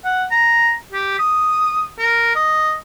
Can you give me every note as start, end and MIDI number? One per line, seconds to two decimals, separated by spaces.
0.04 0.25 78
0.31 0.73 82
0.92 1.17 67
1.19 1.87 87
1.99 2.33 70
2.35 2.74 75